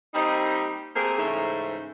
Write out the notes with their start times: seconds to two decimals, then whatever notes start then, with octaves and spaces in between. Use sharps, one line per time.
0.14 G3 A#3 C4 D#4
0.95 A3 A#3 C4 G4 G#4
1.18 G#2 C#3 E3 A3 A4 C5